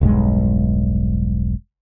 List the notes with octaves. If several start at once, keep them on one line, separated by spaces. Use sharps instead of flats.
E1 B1 G2 G#3